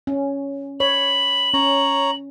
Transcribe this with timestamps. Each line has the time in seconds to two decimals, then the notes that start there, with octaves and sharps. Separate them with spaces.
0.07 C#4
0.80 C#5 B5 F#7
1.54 C#4 C#5 A#5